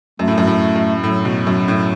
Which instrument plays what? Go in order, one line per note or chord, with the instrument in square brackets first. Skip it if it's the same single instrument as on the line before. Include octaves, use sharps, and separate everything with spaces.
[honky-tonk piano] F#2 [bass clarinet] A3
[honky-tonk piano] A2
F#2
A2
F#2
[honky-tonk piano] A2 [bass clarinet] F#3
[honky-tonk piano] B2
F#2
A2